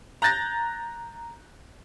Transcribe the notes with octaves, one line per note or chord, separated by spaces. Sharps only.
A#5 F#6 G6 A6 A#6